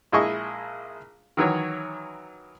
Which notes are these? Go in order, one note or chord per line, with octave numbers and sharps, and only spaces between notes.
A#1 G#3 E4 G#4 D#5 C#6
D#3 E3 F#3 C#5